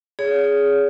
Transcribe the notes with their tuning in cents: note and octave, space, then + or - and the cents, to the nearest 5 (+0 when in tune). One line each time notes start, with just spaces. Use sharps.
G#4 +0 C#5 +35